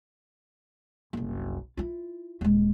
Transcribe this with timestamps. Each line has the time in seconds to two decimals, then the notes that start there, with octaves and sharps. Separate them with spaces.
1.13 F#1 C2
1.77 E4 F4
2.41 D#1 G#3